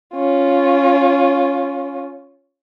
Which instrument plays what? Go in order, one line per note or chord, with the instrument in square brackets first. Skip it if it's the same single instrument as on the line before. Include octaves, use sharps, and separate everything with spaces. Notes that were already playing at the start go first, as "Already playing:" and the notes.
[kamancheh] C#4 F4